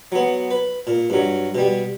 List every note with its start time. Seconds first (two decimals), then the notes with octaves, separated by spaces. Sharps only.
0.12 F#3 B3
0.51 B4
0.87 A#2
1.10 G2 F#3
1.55 B2 G3